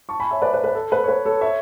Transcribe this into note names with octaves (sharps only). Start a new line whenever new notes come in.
A5 C#6
G#5 B5
C#5 E5
B4 D5
B4
B4
A4
B4
C#5
B4
A4 C#5
C#5 E5